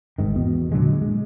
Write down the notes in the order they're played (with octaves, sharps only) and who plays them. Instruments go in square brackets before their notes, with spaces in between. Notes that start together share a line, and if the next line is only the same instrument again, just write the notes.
[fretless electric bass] G#1 G#2 D#3
E2 B2
A#2 D3 F#3 G#3
G#3